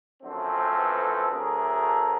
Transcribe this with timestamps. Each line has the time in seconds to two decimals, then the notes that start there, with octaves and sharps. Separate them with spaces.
0.23 F#2 D3 F3 A3 C4
0.76 A4 B4
1.30 D2 D3 F#3 A3 G#4 A#4